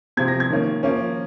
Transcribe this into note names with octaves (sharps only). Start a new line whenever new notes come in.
C3 F3 C4 G#6
A#6
G#6
D#3 A#3 C#4
F3 A#3 C#4